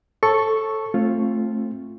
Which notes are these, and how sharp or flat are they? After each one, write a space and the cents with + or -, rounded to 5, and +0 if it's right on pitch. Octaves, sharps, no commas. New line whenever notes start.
A4 +0 C#5 -35 C#6 +0
A3 +0 C4 +25 F4 +0